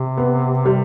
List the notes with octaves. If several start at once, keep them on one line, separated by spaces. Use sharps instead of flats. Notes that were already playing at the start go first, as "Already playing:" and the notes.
Already playing: C3
B3
G3